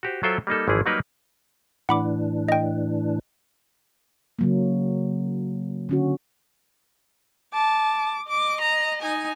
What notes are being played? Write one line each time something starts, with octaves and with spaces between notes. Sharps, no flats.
F#4 G4 C5
F#3 F4 A4 C5 E5 G5
G3 A#3 D#4 A4
G#1 E3 F3 E4 G#4
F#3 G3 A#3 D#4 A#4 B4
A2 E3 D4 F#5 B5 D6
D#5 G5
C#3 F#3 A#3
D3 C#4 F#4
A5 D6
D#5 D6
A#5
D#4 G#5